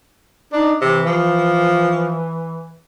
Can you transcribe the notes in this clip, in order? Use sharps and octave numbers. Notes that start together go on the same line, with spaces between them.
D4 D#4
C3 E3
F3